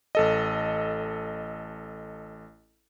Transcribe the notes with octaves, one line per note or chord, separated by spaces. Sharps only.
A1 A4 D#5